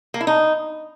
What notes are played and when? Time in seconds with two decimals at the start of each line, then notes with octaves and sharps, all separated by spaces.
0.14 A#3
0.21 E4
0.27 D#4